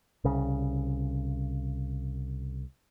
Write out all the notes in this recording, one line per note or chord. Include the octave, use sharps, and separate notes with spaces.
C2 C#3